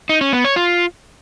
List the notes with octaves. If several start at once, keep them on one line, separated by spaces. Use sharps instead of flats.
D#4
C#4
B3
C#5
F4